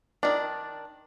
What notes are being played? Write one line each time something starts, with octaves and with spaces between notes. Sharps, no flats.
D#3 D4 D5